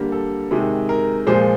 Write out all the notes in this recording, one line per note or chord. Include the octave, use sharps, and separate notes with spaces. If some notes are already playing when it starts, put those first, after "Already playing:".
Already playing: D3 G3 A#3
A4
C3 D#3 G#3
A#4
A#2 F3 G#3 C5